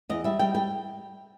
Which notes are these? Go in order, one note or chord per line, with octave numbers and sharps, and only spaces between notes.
E2 D#5
G3 E5
G3 G5
G3 G5